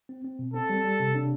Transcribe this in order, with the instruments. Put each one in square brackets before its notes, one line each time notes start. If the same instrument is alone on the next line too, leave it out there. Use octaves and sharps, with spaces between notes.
[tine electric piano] C4
C4
B2
[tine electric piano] C4 [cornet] A4
[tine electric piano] G3
G3
C3
D4